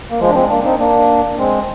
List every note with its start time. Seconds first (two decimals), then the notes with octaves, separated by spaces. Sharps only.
0.11 A#3
0.20 F3 G#3
0.29 D4
0.34 G#3 C4
0.50 A#3 D4
0.65 C4 D#4
0.79 A#3 D4
1.38 G#3 C4